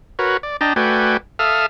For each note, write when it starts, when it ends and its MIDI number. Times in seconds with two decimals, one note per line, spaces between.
0.19 0.37 66
0.19 0.37 70
0.19 0.37 71
0.19 0.37 73
0.43 0.57 74
0.61 0.73 62
0.61 0.73 75
0.61 0.73 79
0.61 0.73 81
0.61 0.73 82
0.76 1.17 57
0.76 1.17 66
0.76 1.17 71
0.76 1.17 74
0.76 1.17 79
0.76 1.17 80
1.39 1.66 69
1.39 1.66 76
1.39 1.66 77
1.39 1.66 87
1.39 1.66 89